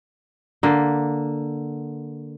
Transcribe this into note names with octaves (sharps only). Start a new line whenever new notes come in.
D3 A#3